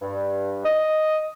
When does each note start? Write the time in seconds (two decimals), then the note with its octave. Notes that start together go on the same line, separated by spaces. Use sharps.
0.01 G2
0.64 D#5